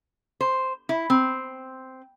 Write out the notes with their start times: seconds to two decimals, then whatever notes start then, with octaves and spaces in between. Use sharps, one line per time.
0.41 C5
0.89 E4
1.10 C4